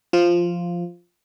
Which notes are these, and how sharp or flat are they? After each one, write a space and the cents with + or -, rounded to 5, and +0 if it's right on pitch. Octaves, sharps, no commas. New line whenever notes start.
F3 +0 F4 -5